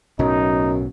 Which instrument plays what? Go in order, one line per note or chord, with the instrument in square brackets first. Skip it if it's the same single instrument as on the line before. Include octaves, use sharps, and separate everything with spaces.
[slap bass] B1 A2 F#3 [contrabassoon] F#2 [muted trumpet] D#4